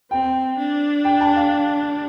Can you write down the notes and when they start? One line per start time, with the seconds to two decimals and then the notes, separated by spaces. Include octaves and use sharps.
0.11 C4 G5
0.58 D4
1.05 G5
1.21 A5
1.36 F5